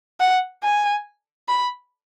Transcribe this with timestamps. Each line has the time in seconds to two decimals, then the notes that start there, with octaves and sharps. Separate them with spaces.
0.20 F#5
0.63 G#5
1.48 B5